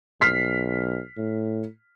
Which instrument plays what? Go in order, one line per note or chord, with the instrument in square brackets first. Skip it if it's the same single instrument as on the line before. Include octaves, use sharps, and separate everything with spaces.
[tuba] B1 [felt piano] F6 B6 C7
[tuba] A2